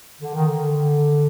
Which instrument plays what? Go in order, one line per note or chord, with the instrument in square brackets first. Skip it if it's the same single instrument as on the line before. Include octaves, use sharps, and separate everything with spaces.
[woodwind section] D3
D#3
D3